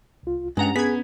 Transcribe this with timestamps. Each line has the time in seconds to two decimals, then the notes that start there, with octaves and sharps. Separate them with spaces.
0.23 C2 F4
0.57 G2 G#3 C#4 F#5 A#5
0.76 B3 G#4 G#6 B6